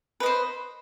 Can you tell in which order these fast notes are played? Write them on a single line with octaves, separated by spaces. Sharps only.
B4 D#5 C5